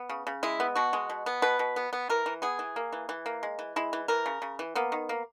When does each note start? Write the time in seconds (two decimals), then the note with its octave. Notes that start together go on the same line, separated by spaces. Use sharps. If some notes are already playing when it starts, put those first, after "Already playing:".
Already playing: B3
0.09 C#3
0.27 C#3
0.43 G#3 E4
0.60 B3
0.75 B2 F#4
0.93 G#3
1.10 B2
1.26 B3
1.42 B2 B4
1.59 B2
1.76 B3
1.93 B3
2.09 E3 A#4
2.26 E3
2.42 B3 G#4
2.59 E3
2.76 A#3
2.93 E3
3.09 E3
3.26 A#3
3.43 G#3
3.59 E3
3.76 G#3 E4
3.93 E3
4.08 E3 A#4
4.26 C#3
4.42 C#3
4.59 E3
4.75 A#3 B3
4.92 D#3
5.09 A#3